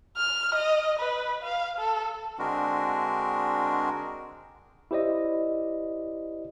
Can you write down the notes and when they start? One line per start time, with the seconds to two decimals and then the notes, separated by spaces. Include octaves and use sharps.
0.17 F6
0.55 D#5
0.99 B4
1.43 F5
1.79 A4
2.39 D3 G#3 C4 D4 F#4 A#4
4.91 E4 G4 C5 D5 D#5